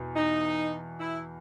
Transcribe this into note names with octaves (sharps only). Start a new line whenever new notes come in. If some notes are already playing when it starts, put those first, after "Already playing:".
Already playing: E2 B2
D#4
E4